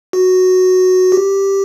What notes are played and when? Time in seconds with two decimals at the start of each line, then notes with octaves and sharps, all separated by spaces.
0.13 F#4
1.12 G4